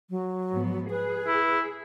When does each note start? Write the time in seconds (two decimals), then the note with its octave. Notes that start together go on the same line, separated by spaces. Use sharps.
0.10 F#3
0.52 G#2 F3 B3
0.90 G#4 B4
1.27 E4